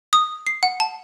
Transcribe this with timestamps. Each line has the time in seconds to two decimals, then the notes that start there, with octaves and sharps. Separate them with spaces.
0.13 D#6
0.47 C7
0.63 F#5
0.80 A5